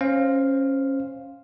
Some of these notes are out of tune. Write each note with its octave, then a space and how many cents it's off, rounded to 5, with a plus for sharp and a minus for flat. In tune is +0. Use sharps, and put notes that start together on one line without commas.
C#4 -20 C5 +0 F5 +0